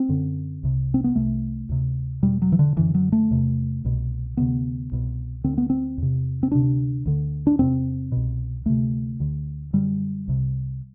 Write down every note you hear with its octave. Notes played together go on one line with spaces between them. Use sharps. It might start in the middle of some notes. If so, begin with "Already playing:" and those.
Already playing: C4
F#2 D3
C2 C3
C4
B3
C2 C3 A3
D2 C3
E2 B2 G3
F#3
E3
D3
F#2 D3 E3
F#3
A3
E2 C3
C2 B2
D2 C3 B3
C2 B2
D2 D3 C4
B3
C4
E2 C3
C4
D2 C3 D4
D2 D3
D4
E2 C3 C4
C2 B2
D2 C3 A3
D2 D3
F#2 D3 G3
C2 C3